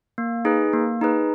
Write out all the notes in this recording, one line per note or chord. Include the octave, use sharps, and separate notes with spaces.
A#3
D#4 G#4 B4
A#3
D#4 G#4 B4